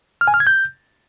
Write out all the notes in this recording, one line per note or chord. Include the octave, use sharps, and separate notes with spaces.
F6
G#5
F6
G#6
G6